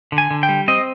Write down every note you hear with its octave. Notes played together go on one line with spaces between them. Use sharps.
D3
G#5
D3
G5
G3
C4 D#5